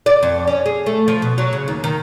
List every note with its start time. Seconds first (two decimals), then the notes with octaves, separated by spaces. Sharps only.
0.06 D5
0.23 F2
0.47 C#4
0.66 G#4
0.86 A3
1.08 F3
1.22 B2
1.38 F#3
1.53 C#3
1.68 D#2
1.84 D#3